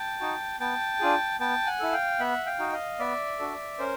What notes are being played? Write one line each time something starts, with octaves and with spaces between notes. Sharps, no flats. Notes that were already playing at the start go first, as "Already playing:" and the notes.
Already playing: G5 A5
D#4 F#4
B3 G5 A5
D4 F4 G#4
B3 G5 A5
F#5 G#5
E4 A4
F5 G5
B3 E5 F#5
F5 G5
D#4 F#4
D#5 F5
B3 D5 E5
D4 F#4 A4
C#4 A#4 C5